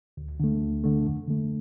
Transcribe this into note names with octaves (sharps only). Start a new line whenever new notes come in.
D2
D3 A3
D2
D3 A3
F2
D3 A3